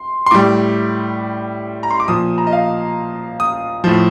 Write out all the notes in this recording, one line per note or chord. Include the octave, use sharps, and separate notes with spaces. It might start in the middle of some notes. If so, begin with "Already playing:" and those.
Already playing: C6
C6
A2 G3 D6
A#5
C6
D6
A#2 F3 D#6
A#5
D#5
F5
D#6
A2 F3